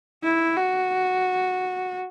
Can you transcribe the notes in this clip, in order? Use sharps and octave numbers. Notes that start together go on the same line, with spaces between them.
E4
F#4